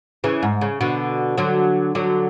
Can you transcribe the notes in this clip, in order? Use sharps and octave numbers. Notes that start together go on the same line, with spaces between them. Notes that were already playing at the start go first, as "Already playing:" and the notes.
C#3 E3
G#2
C#3
B2 D3
D3 F#3
D3 F#3